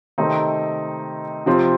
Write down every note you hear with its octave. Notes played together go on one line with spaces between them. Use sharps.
C3 D#3 A3 C4 D#4
C3 F3 C4